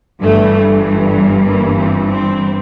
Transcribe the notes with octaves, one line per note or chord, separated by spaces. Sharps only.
G1 G2 E3 A3
A#3
C4
C4